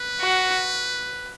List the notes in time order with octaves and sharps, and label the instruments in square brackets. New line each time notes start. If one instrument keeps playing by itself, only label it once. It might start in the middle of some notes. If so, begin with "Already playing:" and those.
Already playing: [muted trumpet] B4
[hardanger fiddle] F#4